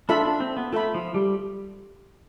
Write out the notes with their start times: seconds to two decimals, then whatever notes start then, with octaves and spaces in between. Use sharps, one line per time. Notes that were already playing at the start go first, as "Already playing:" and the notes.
0.09 D4 F4 A4 E5 B5
0.25 D4
0.40 C4
0.57 B3
0.72 A3 F4 A4 E5 B5
0.94 F3
1.14 G3